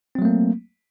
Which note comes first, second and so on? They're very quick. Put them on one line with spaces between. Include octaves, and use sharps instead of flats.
C4 F#3 A3 A#3